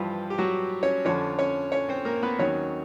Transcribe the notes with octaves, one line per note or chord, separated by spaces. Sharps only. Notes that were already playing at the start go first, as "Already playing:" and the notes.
Already playing: G2 E3 F3 G3 F4
G4
F#3 F#4
C#4 C#5
F2 D3 F3 C#4 C#5
C#4 C#5
C#4 C#5
C4 C5
A#3 A#4
B3 B4
D#2 D#3 F#3 C#4 C#5